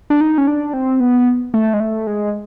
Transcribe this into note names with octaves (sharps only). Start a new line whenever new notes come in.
D4
D#4
C#4
D4
C4
B3
A3
G#3
A3
G#3